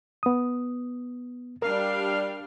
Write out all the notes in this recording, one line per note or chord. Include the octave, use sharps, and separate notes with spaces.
B3 D#6
G3 D4 A#4 F5